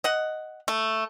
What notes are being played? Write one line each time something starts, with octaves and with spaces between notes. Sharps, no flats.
D#5 F#5
A3